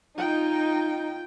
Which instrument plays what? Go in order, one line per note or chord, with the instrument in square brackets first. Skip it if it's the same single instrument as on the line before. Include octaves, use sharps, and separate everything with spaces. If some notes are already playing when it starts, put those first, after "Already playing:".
[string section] D#4 [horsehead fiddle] F4 G5